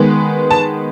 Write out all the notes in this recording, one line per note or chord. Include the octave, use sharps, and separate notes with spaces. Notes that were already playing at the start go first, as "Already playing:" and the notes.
Already playing: D#3 G#3 B3
A5